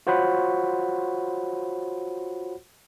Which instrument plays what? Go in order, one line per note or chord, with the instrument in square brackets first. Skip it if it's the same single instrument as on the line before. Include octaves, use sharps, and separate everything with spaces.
[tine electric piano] F4 F#4 C5 C#5 F#5 B5